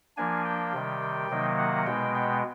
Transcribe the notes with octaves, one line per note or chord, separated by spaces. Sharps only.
F3 A#3 D4 G#5
G5
C3 D#3 G3
C3 D#3 F#3 A#3 D#4
F#5
B2 G#3 B3 G5
G5